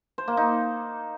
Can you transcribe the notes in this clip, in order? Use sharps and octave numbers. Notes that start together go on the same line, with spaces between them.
C5
A#3
D#4